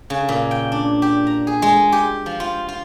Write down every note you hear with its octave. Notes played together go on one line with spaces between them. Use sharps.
C#3
A#2
G5
D4
G4
A#5
G#4
G#3
G4
F3
F4
F4